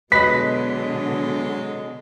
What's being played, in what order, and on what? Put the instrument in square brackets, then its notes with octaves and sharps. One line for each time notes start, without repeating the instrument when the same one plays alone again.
[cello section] B2 D3 [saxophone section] F#3 G#3 [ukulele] B4 D#5 [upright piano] B6